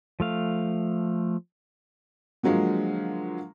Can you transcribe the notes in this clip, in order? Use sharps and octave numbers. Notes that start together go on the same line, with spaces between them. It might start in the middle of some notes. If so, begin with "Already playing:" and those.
F3 A3 F5
D3 F3 F#3 G#3 A#3